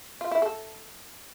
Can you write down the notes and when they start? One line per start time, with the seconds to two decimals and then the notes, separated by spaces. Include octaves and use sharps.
0.21 F4
0.31 E4
0.42 A4